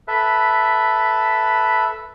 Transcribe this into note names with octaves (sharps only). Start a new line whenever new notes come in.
A4 B4 E5